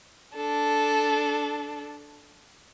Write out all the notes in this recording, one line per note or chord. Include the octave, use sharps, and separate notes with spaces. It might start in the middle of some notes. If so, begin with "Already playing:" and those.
D4 A4